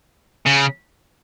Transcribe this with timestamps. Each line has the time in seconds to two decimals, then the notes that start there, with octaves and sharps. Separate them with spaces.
0.46 C#3